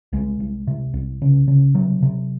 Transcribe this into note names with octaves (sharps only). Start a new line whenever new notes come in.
C2 G#3
C2
C3
C2
C#3
C#3
C3 F#3
C3